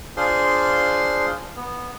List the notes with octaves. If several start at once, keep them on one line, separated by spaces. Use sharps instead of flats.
D4 F4 G#4 C5 C6
B3